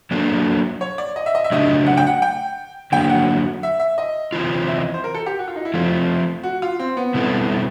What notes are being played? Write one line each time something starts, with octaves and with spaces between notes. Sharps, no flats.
F#3 A#3 D4 F#4 A4
C#5
D5
D#5
E5
D#5
E5
C#3 F#3 A3 D4 G4 D#5
F#5
G5
F#5
G5
D3 F#3 A#3 G5
F#5
E5
E5
D#5
C3 E3 G#3 C#4 F4
E5
D#5
C5
A#4
A4
G4
F#4
F4
D#4
E4
F3 A3 C4 F4
F#4
F4
C4
B3
B2 G3 C4 E4 A4